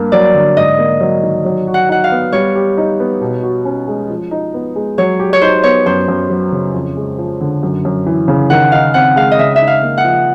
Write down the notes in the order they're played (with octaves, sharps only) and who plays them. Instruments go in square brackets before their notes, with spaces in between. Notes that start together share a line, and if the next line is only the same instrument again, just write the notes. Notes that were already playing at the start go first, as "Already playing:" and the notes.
Already playing: [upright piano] G2 A#3
[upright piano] F#3 [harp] D5
[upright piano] D3
[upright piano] G#2 [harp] D#5
[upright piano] A#3
F#3
D#3
F#3
F#4
[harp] F#5
[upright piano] D#4 [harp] F#5
[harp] F5
[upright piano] B3
[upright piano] G3 [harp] C#5
[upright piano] G4
D#4
B3
B2
F#4
C#4
G#3
F3
D#4
B3
G#3
[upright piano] F#3 [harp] C#5
[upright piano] G4
[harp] C#5
[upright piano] D#4 [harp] C5
[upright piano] B3 [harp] C#5
[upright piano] F#2 [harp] C5
[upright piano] F#2
F#3
C#3
F2
G#3
F3
D3
F#2
F#2
E3
C#3
[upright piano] D#3 [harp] F#5
[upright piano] D#4 [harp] F5
[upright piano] C4 [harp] F#5
[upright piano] G#3 [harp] F5
[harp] D#5
[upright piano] C#3 [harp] E5
[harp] E5
[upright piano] D#4
[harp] F5
[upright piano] A#3
[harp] F#5
[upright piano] F3